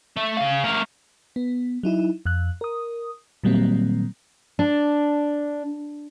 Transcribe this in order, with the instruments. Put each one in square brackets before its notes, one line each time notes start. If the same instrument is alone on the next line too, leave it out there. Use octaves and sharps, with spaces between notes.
[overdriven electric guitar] A3
C#3 F5
A3 A#4
[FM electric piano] B3
F#3 D#4 E4
F2 F#6
A#4 D#6
A#2 D#3 F#3 G3 A#3 C4
[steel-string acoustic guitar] D4